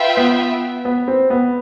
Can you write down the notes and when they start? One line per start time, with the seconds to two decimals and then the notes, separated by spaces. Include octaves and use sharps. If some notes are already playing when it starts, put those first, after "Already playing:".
Already playing: F4 B4 E5 G5
0.17 B3
0.85 B3
1.08 C4
1.30 B3